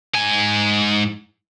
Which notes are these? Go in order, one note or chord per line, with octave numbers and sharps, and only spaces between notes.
G#2 G#5